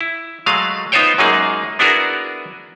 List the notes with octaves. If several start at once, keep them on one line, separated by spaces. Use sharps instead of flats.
E4
F#3 G#3 A3 G#4 F5
B3 D#4 F4 C5 C#5 G5
F#2 F#3 G#3 A#3 D#4 G#4
B3 D4 E4 F#4 G#4 A#4